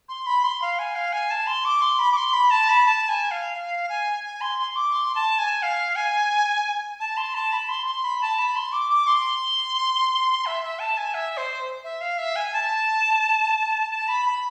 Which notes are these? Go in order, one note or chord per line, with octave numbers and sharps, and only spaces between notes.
C6
B5
C6
F5
G#5
F5
G#5
A5
C6
D6
C6
B5
D6
C6
B5
A5
B5
A5
G#5
F5
F5
G#5
G#5
C6
C6
D6
C6
A5
G#5
F5
G#5
A5
C6
A5
B5
C6
C6
B5
A5
B5
C6
D6
D6
C6
E5
E5
A5
G#5
E5
C5
E5
F5
E5
G#5
A5
A5
B5
B5